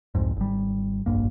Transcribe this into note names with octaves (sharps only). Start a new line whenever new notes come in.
C2 F2 G#2
G#1 G3
F1 A#1 G2 A#3